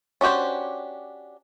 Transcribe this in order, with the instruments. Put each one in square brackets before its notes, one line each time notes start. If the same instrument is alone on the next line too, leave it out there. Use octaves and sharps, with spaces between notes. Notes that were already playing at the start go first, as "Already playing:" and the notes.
[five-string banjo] C#4 D4 F#4 G4 C5